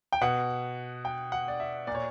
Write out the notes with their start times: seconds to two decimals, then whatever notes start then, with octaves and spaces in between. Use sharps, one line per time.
0.12 G5
0.21 B2 F#5
1.05 G5
1.32 F#5
1.48 D5
1.60 E5
1.87 A#2 D5
1.95 C#5